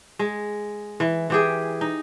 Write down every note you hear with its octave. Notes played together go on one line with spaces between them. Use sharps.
G#3
E3
E3 G4 G#4
D#4